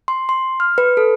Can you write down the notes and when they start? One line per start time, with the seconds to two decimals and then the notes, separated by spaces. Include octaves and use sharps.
0.08 C6
0.29 C6
0.60 F6
0.78 B4
0.97 A4